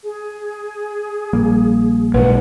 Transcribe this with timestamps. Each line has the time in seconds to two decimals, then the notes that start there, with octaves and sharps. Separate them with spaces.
0.03 G#4
1.33 A#1 G3 A#3
2.14 B1 G#2 B4 F#5